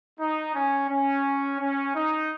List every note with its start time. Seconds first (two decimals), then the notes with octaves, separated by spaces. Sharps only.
0.19 D#4
0.55 C#4
0.89 C#4
1.60 C#4
1.95 D#4